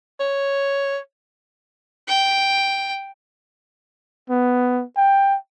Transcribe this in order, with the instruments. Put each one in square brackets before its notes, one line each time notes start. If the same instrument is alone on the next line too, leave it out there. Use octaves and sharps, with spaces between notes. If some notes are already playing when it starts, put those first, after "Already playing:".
[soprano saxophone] C#5
[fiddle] G5
[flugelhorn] B3
G5